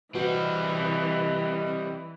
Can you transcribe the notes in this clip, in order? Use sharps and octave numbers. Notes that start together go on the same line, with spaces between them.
E3 G3 C4 F#4 B4 D#5